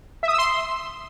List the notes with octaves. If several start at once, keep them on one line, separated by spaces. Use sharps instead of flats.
E5
D#6
E6
C6